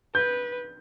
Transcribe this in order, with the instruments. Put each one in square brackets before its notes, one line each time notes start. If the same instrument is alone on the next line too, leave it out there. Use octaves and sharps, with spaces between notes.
[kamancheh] B4 [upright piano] G6